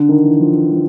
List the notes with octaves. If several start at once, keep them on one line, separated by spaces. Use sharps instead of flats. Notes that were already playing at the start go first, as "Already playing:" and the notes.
Already playing: D3
D#3
E3
F3
F3